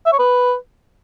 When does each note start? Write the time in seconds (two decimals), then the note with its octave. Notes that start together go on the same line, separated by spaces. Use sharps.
0.06 E5
0.12 C#5
0.19 B4